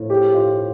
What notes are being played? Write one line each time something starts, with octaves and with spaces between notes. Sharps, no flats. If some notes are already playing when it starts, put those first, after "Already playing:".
Already playing: A2 F3
G4
F4